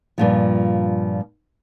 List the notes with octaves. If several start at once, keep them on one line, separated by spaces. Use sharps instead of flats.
G2 A#2 F3